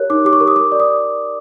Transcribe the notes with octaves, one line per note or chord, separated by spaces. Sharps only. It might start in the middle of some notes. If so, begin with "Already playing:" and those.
Already playing: G4 A#4 C#5 F#6
D#4 D6
G4 D6
C#6
A#4
D#6
A#4 D6
D5
D#6